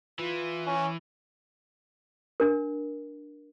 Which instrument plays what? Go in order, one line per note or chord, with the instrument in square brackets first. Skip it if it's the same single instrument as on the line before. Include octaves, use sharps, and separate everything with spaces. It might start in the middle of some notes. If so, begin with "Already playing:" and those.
[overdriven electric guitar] E3 [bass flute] F4
[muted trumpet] C#4
[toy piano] D4 A#4